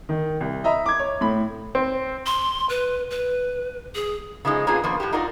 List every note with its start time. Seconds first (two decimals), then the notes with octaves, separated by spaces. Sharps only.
0.09 D#3
0.41 C2
0.64 D#5 E5 A#5 B5
0.86 D6 G#6
0.99 C#5
1.21 A2 B5
1.75 C4
2.26 C6
2.69 B4
3.11 B4
3.95 G#4
4.45 C#3 F3 G#3 D#4
4.67 A#3 B3 C#4 D4 F4 G#4
4.84 F3 A#3 B3
5.00 A2 F#4 G4
5.13 D#4 F4 F#4 A#4 D5